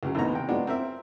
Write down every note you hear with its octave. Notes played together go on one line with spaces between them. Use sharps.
C#2 C#3 F#3
G#1 D#2 A2 A#3 B3 A#5
C3 G5
F#3 G#3 B3 D4 F4 F#4
C4 A#4 E5